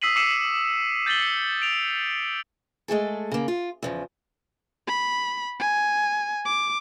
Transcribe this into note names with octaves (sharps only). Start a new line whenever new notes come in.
D#6 E6 B6 C7 D#7 F#7
D6 E6 C7 C#7 D#7 E7
G6 A6 B6 F#7 G7
C#7
D7 F7
G#3 A3 G#4 A4
C#3 A#3
F4
E2 C#3 F3
B5
G#5
D6